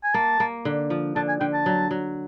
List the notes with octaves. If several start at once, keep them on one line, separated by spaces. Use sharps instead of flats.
G#5
A#3 A5
A#3
D3
F3
D3 A5
G#5
D3 G5
A5
F#3
F#3